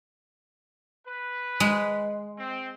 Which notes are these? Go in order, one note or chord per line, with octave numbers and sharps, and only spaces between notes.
B4
G#3
C4